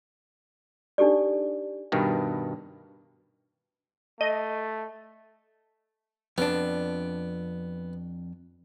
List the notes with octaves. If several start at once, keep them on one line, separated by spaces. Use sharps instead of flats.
D4 D#4 G4 A4 D5
G2 B2 D#3
A3 D#5
F2 B3 D4